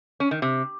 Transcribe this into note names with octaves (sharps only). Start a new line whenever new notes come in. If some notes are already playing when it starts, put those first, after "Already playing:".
C#4
D#3
C3